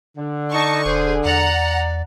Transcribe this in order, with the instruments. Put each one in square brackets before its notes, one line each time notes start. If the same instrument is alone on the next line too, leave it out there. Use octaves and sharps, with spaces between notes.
[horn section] D3
[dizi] D#4 [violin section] A5 C#6
[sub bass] E1 [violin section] G#4 [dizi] C5
[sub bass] E2 [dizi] D5 [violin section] F#5 A#5